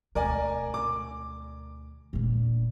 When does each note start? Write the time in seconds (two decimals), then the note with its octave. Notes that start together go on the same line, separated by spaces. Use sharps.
0.15 D2 B2 A#4 D5 G#5
0.74 D6
2.13 A#2 D3